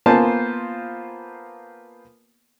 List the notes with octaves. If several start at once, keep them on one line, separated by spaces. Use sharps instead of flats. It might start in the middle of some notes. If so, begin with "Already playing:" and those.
A#3 B3 F4 C5 G#5 A5